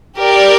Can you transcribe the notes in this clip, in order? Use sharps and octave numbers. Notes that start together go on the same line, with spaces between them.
G4 A#4 D5